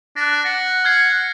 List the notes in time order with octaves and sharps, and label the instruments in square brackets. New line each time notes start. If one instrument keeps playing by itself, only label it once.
[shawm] D4 [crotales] F#6 A#6
[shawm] F#5 [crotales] A#6
[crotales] F6 G#6 C7